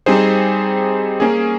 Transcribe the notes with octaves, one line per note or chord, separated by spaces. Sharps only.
G3 C4 D#4 G#4 C5
A#3 C#4 G#4